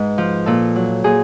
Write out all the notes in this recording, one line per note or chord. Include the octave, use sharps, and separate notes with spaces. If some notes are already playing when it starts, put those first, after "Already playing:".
Already playing: G#2 B4
F3
A#2 A4
F#3
A#2 G#4